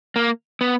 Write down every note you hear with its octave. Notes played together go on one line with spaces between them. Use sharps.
A#3
B3